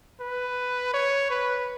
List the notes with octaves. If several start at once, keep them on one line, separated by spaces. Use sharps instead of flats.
B4
C#5
B4